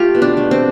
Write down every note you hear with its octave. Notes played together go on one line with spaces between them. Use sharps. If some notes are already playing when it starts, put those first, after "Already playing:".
Already playing: A3 F4 G4
B2
D4
A3
C4